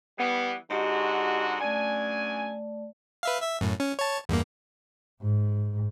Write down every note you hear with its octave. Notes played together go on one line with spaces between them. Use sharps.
E3 G3 B3
G#2 D3 F#4 G4 D#5
F#2 A3 D4 D5 G#5
B4 E5 F5
E5
F#2 A2
C#4
C#5 A5
E2 G2 A#3
G#2